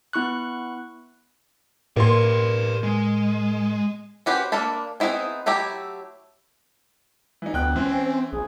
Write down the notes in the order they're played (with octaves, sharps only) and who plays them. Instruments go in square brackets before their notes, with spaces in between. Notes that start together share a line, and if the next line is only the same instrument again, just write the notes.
[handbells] B3 E4 C#6 F#6
[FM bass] A2 [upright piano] A#3 C6 [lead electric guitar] B4 D5
[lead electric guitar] G#3
[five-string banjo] C#4 F#4 G4 B4 C5
A#3 D4 A4 A5 B5
B3 C4 D#4 E4 G#4
F#3 A3 E4 G4 A#5
[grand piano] E3 D#4
[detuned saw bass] D2 [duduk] B3 [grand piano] G5 F#6
[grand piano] E3 [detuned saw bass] C4 [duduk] C#4
[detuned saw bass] A#1 [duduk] G#4